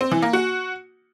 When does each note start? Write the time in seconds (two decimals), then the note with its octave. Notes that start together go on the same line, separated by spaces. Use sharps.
0.01 C4
0.12 E3
0.22 A#3
0.33 F#4